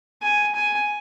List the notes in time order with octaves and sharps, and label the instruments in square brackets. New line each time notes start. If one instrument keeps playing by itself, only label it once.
[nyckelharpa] G#5
G#5